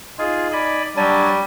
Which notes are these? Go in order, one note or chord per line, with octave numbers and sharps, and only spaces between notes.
D#4 F4 G#4
D5 G#5 B5
F#3 G3 D4 G#5 A6